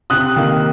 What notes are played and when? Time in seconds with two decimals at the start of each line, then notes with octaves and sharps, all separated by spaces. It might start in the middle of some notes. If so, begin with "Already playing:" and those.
0.10 C3 D#6 F#6
0.36 D#3 A#3